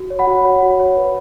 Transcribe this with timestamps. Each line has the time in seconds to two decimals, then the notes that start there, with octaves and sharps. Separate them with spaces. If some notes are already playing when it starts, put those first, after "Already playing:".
Already playing: F#4
0.10 C#5
0.19 F#5 B5
0.27 F#4
0.45 C#5
0.62 F#4
0.80 C#5
0.97 B4